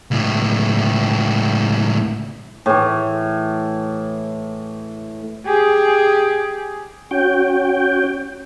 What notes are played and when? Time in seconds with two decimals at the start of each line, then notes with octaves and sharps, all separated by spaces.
0.11 C#2 A2
2.66 A2 E3
5.46 G4 G#4
7.11 C#4 F#4 G5